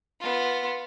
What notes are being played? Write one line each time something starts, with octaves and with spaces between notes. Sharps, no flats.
B3 F4